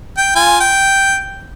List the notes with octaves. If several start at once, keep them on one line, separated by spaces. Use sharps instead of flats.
G5
F4 G#5
G5